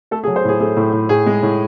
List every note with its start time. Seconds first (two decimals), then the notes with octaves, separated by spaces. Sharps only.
0.11 A3 A4
0.24 G#4
0.27 F#3
0.36 C5
0.44 A2 G#4
0.60 A3 G#4
0.76 A2
0.93 A2
1.09 A2 G#4
1.26 G#3
1.43 A2